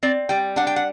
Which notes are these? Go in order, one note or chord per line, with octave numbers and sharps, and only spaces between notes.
C4 D5
G3 G5
D4 F#5
G5
F#5